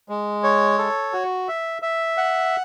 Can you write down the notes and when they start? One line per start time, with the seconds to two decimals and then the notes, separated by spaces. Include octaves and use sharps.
0.09 G#3
0.43 C#5
0.78 A4
1.13 F#4
1.48 E5
1.82 E5
2.17 F#5